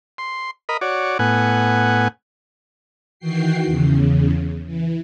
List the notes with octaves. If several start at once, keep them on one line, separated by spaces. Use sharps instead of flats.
C6
A#4 D#5 B5
F#4 C#5 D5
A2 B3 F#5 G#5
D#3 E3 F#4 G5 C7
E2 C#3
E3